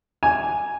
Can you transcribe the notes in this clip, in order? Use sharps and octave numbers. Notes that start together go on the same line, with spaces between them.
G#5